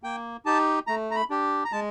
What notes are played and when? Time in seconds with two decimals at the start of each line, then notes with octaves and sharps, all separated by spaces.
0.03 A#3 G5
0.45 D#4 G4 A5
0.87 A3 A#5
1.11 A#5
1.16 B5
1.30 D4 G4
1.65 A#5
1.72 G#3 A5